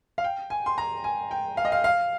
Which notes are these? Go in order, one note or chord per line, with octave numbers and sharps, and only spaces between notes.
F5
G5
G#5
C6
A#5
G#5
G5
F5
D#5
F5
F5